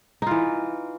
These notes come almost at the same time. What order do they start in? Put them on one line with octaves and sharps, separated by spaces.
D#4 F4 E3